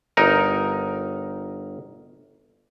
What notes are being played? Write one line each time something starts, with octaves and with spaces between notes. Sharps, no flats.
G1 D#4 A#4